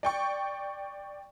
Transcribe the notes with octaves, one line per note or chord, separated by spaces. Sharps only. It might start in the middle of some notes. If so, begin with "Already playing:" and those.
D5 G5 C#6